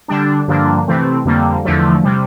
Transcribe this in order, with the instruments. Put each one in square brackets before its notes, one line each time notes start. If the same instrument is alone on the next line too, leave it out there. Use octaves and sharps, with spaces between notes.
[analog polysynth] D3 G3 D4
G2 D3 F3 A#3 D4
C3 E3 A3 C4
F2 D3 G3 A#3
E2 D3 F3 A3
C3 G3